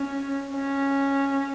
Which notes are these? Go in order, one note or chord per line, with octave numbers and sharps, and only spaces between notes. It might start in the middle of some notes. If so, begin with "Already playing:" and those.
Already playing: C#4
C#4